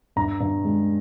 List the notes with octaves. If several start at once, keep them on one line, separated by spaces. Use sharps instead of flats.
G2 A#5
G2
G#3